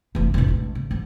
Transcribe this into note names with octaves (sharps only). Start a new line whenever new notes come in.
F1 E3
E1 A1
A1 A2
C#3
G#2